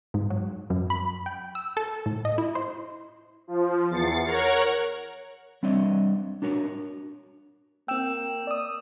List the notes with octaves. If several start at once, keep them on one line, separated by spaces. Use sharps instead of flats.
G#2
F#3
F#2
B5
G5
E6
A4
A2
D#5
E4
C5
F3
E2 A6 C7 C#7
A#4 C#5 F#5 A#5 C#6
G3 C4 D4 C#5 D#5 E5
D4 F#4 A#4 C#5
A#3 C4 G5 E6 E7
D5 D#6